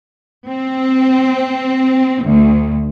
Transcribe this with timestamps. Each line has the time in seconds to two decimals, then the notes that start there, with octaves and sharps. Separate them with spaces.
0.46 C4
2.21 D2